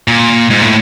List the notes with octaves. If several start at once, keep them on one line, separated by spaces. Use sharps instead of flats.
A#2
G#2
A2